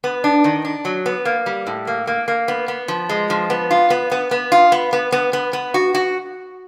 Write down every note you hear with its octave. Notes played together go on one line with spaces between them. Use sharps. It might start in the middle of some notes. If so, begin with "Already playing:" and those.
B3
D4
D#3
D4
F#3
B3
A#3
G3
A2
A#3
A#3
A#3
B3
B3
F3
G#3
F3
B3
F4
B3
B3
B3
F4
B3
B3
B3
B3
B3
F#4
F#4